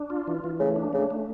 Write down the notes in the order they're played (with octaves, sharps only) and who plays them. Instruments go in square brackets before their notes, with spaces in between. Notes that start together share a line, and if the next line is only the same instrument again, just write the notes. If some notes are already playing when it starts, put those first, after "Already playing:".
Already playing: [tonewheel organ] D4
F4
E3
E3
[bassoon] C#3 [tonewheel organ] A3
[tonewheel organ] D4
[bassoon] C#3 [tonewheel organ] A3
[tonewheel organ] A3